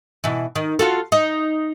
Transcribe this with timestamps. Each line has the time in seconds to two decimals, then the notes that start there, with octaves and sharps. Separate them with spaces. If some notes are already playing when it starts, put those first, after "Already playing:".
0.24 B2 E3
0.55 D#3
0.79 F4 F#4 A4
1.12 D#4